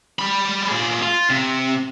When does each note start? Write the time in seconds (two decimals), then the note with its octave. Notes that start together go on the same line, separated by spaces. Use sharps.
0.19 G3 B5
0.68 A#2 G#4
1.02 F4
1.30 C3